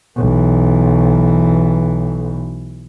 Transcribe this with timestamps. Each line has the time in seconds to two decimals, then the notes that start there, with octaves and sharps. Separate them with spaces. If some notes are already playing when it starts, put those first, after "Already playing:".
0.17 B1 E3